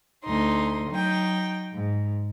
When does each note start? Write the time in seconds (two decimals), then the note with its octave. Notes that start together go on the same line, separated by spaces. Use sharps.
0.23 D2 D#4 C6
0.90 F#3 D#4 G5
1.72 G#2